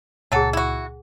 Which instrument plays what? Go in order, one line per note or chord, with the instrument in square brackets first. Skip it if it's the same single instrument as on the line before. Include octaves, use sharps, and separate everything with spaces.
[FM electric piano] C#2 A#2 [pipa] F#3 A4 [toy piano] G#4 F#5 G#5
[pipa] E4 F#4